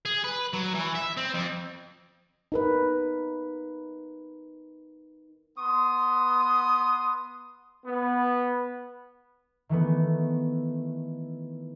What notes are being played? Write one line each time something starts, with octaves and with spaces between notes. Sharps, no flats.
G#4
B4
F#3
E3
E5
C4
F2
D#4 A#4 B4
B3 C6 D#6
B3
D#3 E3 A3 B3